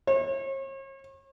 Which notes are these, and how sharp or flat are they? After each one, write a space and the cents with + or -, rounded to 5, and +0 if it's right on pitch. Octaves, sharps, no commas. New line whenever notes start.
C#5 -40